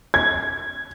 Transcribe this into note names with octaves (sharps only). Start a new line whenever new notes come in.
G#6